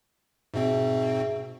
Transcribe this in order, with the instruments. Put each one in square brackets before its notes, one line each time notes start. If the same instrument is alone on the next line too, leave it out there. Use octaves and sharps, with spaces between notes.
[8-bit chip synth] G#2 B2 C4 [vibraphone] G#4 E5